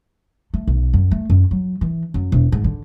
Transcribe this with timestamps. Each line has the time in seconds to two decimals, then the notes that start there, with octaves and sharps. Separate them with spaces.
0.54 A3
0.67 B1
0.93 F#2
1.11 A3
1.30 F#2
1.51 F#3
1.81 E3
2.14 F#2
2.32 E1
2.52 G#2
2.64 D3